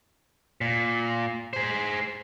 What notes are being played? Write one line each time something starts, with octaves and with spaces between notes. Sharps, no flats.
A#2
G#4 C5